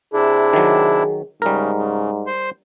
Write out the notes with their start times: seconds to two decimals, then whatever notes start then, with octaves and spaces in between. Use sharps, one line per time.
0.13 C3 D4 E4 G#4
0.53 D#3 F#3
1.42 G#2 C#3 G3 A#4
1.77 C#3
2.27 C5 C6